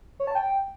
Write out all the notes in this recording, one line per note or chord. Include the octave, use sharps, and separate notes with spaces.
C#5
A5
G5